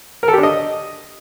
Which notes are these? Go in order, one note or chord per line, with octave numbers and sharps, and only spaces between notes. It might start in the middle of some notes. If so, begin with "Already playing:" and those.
A#4
A4
G4
D4
D#5